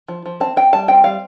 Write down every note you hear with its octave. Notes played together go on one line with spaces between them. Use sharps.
F3
F3
C4 A5
C4 G5
G3 A5
C4 G5
G3 F5